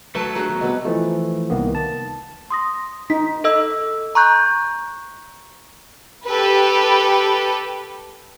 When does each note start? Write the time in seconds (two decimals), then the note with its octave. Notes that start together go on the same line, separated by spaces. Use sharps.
0.15 F#3 A3 B4 A5
0.35 D4 F#4 G#4 A#5 F#6
0.49 D#3 B3
0.61 B2 G3 C4 B4 D#5
0.85 E3 F3 A3
1.50 C2 D#3 A#3 B3
1.75 A5
2.50 C6 D#6 A#6
3.10 D#4 B6
3.44 A4 D#5 E6
4.15 A#5 C#6 F#6 G6
6.25 G4 A4 B4